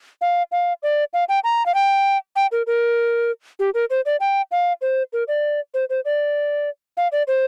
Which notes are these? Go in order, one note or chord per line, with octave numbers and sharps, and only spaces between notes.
F5
F5
D5
F5
G5
A#5
F5
G5
G5
A#4
A#4
G4
A#4
C5
D5
G5
F5
C5
A#4
D5
C5
C5
D5
F5
D5
C5